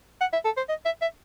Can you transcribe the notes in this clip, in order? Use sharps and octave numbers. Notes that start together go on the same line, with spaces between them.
F#5
E5
A4
C5
D#5
E5
E5